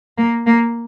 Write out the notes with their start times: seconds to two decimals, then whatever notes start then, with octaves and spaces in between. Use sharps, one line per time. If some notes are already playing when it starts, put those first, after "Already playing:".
0.17 A#3
0.46 A#3